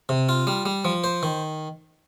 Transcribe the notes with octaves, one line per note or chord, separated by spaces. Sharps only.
C3
F4
G3
G3
F3
C5
D#3